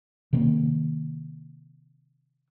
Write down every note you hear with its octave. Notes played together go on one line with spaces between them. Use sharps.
C3 D#3 A#3 C4